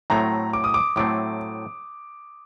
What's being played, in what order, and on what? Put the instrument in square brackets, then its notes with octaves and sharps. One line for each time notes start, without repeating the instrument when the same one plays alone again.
[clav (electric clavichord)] A2 F#3 A3 C4 [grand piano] A#5
[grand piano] D6
D#6
D6
[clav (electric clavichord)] A2 F#3 A3 C4 [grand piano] D6